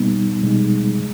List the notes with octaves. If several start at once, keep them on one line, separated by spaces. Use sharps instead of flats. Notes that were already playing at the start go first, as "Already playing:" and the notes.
Already playing: B2 G3 A#3 B3 D#4
B2 G3 G#3 B3 D#4
C3